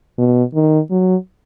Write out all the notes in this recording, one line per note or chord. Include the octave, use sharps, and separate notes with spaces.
B2
D#3
F#3